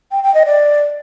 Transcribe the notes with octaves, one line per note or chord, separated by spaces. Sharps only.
G5
G5
D#5
D5